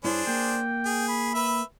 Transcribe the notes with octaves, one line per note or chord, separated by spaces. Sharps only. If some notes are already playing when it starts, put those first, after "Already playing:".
G2 D4 E4 G#4 C5 C#5
A#3 G5
G#4
B5
B4 E5